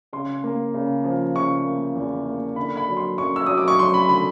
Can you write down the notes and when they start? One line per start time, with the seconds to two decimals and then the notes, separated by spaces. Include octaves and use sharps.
0.13 C#3 C6
0.44 A#3
0.74 C#3
1.04 F3
1.35 C#3 C#6
1.65 A#3
1.96 E2
2.27 A#3
2.56 D3 B5
2.77 B5
2.88 F#3
2.97 C6
3.18 F#2 C#6
3.36 E6
3.46 F#3 D#6
3.58 D6
3.68 C#6
3.79 F#2 C6
3.94 B5
4.08 D3 B5